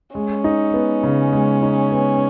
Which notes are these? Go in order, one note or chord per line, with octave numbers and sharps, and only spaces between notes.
G#3 C#4
D#4
B3
C#3
G#3
D#4
B3